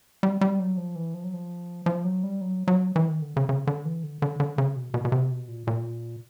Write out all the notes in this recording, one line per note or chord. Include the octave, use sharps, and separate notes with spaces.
G3
G3
F#3
F3
E3
F3
F#3
F3
F3
F#3
G3
F#3
F#3
E3
D#3
D3
C#3
C#3
D3
E3
D3
D3
D3
C#3
B2
B2
B2
C3
B2
A#2
A#2